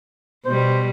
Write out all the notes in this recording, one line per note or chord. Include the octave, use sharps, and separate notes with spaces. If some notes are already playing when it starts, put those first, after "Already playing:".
B2 G3 C5